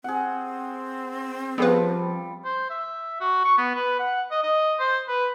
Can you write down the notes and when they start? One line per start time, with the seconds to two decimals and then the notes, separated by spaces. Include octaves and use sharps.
0.04 C4 G#4 F#5
1.58 F3 G3 B3 F4 G#4 B4
2.45 C5
2.70 E5
3.21 F#4
3.45 C#6
3.58 B3
3.75 B4
3.99 F#5
4.31 D#5
4.43 D#5
4.79 C5
5.08 B4